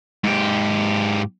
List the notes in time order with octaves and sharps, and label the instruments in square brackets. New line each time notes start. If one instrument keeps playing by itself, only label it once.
[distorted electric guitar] G#2 G4